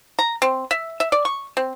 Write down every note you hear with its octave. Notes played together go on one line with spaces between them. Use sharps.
A#5
C4
E5
E5
D5
C#6
C4